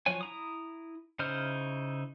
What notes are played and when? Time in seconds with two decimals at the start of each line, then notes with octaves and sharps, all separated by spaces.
0.06 F3 F#3 C#5 G#5
0.21 E4 A#5 D#6
1.19 C#3 D#4 E4 C5 F6